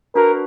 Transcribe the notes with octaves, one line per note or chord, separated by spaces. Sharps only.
D4 F#4 A#4 B4